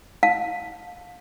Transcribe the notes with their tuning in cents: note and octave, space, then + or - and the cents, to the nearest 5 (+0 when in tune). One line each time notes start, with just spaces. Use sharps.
F5 +25 A5 +0